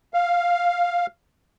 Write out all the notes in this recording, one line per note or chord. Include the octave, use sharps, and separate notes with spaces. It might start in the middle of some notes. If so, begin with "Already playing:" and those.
F5